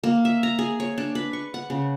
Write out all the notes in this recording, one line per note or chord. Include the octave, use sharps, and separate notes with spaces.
A#3
E5
A#5
G#4
C#5
D4
B4
C#6
F#5
C#3